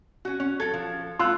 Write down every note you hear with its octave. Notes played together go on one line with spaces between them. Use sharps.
C#4 F#4
C#4
F#3 A4 G#6
F3
A3 F4 C6 E6 F#6